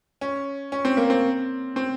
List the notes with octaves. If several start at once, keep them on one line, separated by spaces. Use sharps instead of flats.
C#4
C#4
C4
A#3
C4
C4